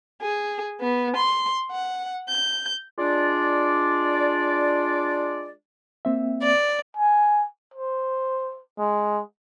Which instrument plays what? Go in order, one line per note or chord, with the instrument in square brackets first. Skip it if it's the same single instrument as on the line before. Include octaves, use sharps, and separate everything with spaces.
[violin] G#4
B3
C6
F#5
G6
[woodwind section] G#3 D4 F4 D5
[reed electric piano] A#3 C4 E5
[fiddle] D5
[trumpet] G#5
C5
G#3